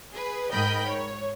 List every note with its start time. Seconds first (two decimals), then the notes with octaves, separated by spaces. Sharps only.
0.13 G#4 B4
0.51 G#2 A#4 D#5 G5 B5 G6
0.86 C#5